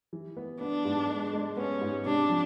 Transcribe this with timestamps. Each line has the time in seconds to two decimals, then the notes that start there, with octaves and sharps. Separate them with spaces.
0.13 E3
0.37 B3
0.61 B3 D4
0.85 G#2
1.09 G#3
1.33 G#3
1.57 B3 C#4
1.81 G#2
2.05 C3 D4
2.29 F3